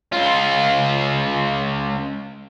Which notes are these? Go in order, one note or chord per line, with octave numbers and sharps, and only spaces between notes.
C#2 F4